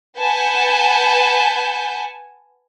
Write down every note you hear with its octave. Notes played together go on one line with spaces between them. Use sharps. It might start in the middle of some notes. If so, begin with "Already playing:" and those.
B4 F#5 G#5 A5 G6